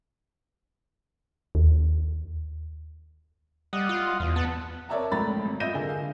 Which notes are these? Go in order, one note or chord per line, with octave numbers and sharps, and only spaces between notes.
D#2
G3 D#5 F#5
F4
E2
B3 F#5 A5
A#4 C#5 D5 E5 A5 A#5
A#1 G#2 A3 A#5 B5 A6
G#1
F4 D#5 E5 G6 A#6 D#7
D3 G#4 A#4
F5